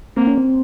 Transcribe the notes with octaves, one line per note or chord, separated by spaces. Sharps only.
A#3 C4
C#4
C4